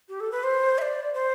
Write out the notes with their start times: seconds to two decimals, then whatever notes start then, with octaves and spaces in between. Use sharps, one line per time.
0.09 G4
0.20 A4
0.32 B4
0.43 C5
0.78 E5
0.82 D5
1.14 C5